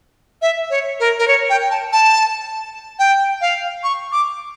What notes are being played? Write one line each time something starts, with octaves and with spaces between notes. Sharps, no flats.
E5
C#5
A#4
A#4
C#5
G5
A5
A5
G5
F5
C#6
D6